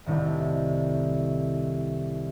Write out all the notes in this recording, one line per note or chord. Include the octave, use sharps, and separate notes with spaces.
C2 A2 D#3